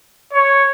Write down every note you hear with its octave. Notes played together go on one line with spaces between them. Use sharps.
C#5